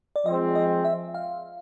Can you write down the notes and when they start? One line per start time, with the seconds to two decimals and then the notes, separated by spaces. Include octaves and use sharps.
0.16 D5
0.26 F3 G#3 C4 D#5
0.55 D#5
0.85 E5
1.14 F5